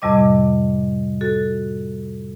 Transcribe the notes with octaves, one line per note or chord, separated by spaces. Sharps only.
F2 A2 C3 G3 D#5 D6
F#4 A4